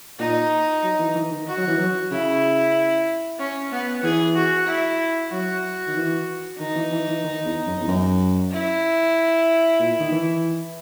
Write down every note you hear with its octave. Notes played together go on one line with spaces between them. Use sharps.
A#2 D#4
F#3
E3
E3
D#3
F#4
F#3
E3
F#3
C#3 E4
C#4
B3
E3 G#4
F#4
E4
F#3 F#4
D#3
E3
D#3 D#4
E3
E3
E3
D#3
E2
F#2
E2
F#2
E4
A#2
D#3
E3